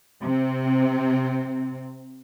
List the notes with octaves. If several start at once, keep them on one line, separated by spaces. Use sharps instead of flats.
C3 C4